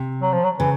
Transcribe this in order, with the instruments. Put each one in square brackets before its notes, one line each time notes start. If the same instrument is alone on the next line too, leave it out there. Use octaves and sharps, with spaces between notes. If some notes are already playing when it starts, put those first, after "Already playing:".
Already playing: [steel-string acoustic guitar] C3
[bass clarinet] F#3
F3
F#3
[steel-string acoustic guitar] C#3 [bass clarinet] E3